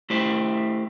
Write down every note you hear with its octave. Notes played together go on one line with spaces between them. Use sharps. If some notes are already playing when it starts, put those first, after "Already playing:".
A3 E4 G4 C5